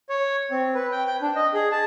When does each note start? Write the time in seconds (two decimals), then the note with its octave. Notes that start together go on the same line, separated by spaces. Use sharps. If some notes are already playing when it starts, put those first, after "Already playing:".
0.09 C#5
0.51 C4
0.75 B4
0.91 G5
1.07 G5
1.22 D4
1.36 D#5
1.54 G#4
1.72 A5